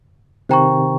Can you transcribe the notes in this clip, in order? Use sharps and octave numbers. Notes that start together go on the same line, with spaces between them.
C3 D#3 C5 G5 A#5 C#6